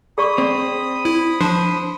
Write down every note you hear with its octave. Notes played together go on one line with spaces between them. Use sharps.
G#4 D5 B5 C#6 D#6
C4 D5
E4
F3 D4 C5